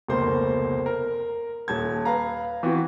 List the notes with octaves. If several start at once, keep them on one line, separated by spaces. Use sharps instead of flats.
F1 C#2 B2 A#3 C5 C6
A#4
D#1 A5 G#6
B4 F5 A#5
E3 B3 C4 F#4